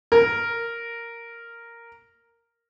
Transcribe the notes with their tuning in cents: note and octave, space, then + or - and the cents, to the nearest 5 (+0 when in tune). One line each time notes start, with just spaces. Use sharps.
A#4 -5